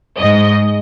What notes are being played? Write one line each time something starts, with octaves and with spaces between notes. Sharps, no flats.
G#2 D#5